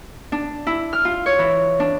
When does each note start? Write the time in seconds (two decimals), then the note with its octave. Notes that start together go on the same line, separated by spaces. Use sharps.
0.32 D4
0.67 E4
0.93 F6
1.05 F4
1.26 C#5
1.39 E3
1.80 D4